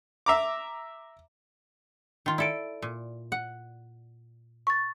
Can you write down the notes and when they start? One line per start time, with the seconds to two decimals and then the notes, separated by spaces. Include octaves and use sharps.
0.26 E5 A#5 D6
2.26 D#3 F4
2.38 E4 A4 D5 D7
2.82 A#2
3.32 F#5
4.67 C#6 A6